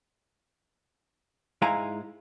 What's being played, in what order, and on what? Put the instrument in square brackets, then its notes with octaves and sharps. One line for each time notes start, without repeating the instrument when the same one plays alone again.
[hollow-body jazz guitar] G#2 G#3 E4 F5 G#5 A#5